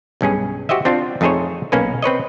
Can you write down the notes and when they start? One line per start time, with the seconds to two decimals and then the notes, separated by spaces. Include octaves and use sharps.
0.21 B1 G2 C#4 G#4
0.69 F#4 G4 C5 D#5 E5
0.85 C4 D4 F4
1.21 F2 A3 D#4 G#4 C5 C#5
1.72 B1 A#3 C#4 B4
2.02 C4 B4 C#5 D#5